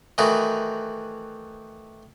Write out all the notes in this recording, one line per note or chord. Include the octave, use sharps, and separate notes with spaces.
D#3 E3 A3 D#4 F#4